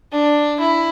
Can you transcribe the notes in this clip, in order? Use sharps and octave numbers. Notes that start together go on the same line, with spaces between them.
D4
E4